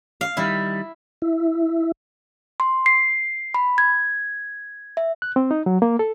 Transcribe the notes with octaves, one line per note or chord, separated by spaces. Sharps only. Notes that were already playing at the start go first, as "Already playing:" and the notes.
F5
D#3 G3 D#4 E4
E4
C6
C7
B5
G#6
E5
F#6
C4
D#4
F#3
A#3
A4